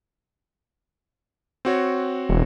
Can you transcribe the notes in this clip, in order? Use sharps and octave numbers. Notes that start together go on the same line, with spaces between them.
C4 F#4 C#5
E1